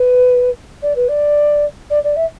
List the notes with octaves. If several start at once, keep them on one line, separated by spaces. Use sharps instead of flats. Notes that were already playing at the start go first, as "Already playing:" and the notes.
Already playing: B4
D5
B4
D5
D5
D5
E5